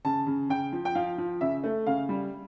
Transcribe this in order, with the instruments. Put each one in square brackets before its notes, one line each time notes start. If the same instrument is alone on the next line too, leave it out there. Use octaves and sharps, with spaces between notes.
[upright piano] C#3 A5
C#3
C#3 G5
F3
G5
F3 F5
F3
C#3 E5
A3
C#3 F5
G3